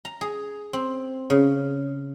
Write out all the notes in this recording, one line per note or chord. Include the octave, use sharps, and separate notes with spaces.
A#5
G#4
C4
C#3